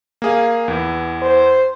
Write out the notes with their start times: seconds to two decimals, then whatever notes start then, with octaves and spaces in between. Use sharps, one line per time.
0.22 A#3 G#4 F5
0.68 E2 E3
1.22 C5